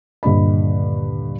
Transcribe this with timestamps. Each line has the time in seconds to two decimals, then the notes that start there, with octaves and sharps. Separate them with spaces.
0.23 D#1 G2 D3 D#5 B5